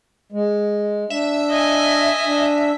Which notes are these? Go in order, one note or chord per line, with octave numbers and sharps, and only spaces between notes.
G#3
D4 E5
D#5 G#5
D4